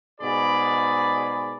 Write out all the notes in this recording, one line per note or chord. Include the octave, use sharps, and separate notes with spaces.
G#2 B2 G#4 D5 B5